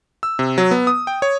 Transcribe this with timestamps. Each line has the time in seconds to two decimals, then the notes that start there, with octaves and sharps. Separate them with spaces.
0.23 E6
0.39 C3
0.58 F#3
0.71 B3
0.87 D#6
1.07 G5
1.22 C#5